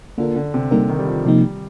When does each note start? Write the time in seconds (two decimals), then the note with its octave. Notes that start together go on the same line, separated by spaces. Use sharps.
0.18 D3 A#3 F4 A#4
0.36 D3
0.54 C3
0.71 D3 G3 A#3 D#4 A#4
0.89 D#3
0.99 G3
1.07 F3
1.25 C3 F3 G3 A#3 D#4